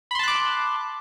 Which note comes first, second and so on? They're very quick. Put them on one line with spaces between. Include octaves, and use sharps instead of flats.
B5 C6 A5 F#6 D6